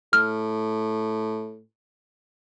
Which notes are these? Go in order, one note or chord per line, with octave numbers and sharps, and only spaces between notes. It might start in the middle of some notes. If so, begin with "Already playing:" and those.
A2 F6